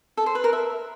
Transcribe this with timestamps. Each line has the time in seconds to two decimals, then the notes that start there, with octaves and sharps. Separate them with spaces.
0.17 A4
0.26 C5
0.35 B4
0.44 A#4
0.53 E5